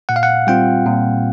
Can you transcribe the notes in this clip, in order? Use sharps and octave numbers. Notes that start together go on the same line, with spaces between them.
A#2 F#5
F5
F#5
G3 C4 F4 G5
A#2